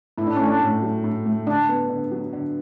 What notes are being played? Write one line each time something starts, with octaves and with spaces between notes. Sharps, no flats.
A2 E4
D4
A3 C#4
D4
A2
F#3
A2
A3
D3 D4
B3
D3
F#3
D3